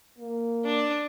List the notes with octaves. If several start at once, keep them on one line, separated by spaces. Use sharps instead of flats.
A#3
D4